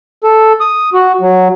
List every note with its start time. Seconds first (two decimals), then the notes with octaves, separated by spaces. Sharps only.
0.24 A4
0.61 D#6
0.93 F#4
1.21 F#3